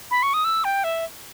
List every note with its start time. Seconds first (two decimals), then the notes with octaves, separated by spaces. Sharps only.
0.11 B5
0.23 C#6
0.34 D#6
0.44 E6
0.64 G5
0.84 E5